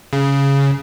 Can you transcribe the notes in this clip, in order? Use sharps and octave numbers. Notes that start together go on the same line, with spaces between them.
C#3